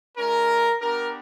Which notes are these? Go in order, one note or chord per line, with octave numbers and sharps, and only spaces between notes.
G#3 C#4 F4 A#4
B3 D4 G4 A#4